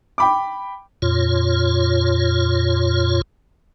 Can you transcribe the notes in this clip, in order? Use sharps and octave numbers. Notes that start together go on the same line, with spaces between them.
G5 B5 D6
F2 A#2 F4 C#5